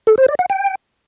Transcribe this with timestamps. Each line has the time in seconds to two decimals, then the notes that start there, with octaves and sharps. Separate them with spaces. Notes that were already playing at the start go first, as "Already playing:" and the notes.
0.07 A4
0.18 C5
0.28 D5
0.39 F#5
0.50 G5